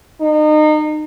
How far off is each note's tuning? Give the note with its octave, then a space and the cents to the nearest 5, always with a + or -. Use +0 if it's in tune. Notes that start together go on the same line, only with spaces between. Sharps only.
D#4 -30